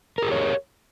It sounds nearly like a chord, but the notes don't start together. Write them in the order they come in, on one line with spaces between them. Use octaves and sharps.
A#4 G#4 G4 C#5